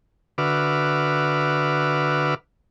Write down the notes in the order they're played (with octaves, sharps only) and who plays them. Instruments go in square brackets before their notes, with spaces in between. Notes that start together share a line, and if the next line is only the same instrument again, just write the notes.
[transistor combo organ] D3 F#4 B4 E5 D6 F6